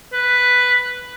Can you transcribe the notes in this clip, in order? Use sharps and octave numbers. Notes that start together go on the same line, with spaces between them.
B4